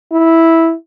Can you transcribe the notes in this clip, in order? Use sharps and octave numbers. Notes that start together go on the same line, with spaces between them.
E4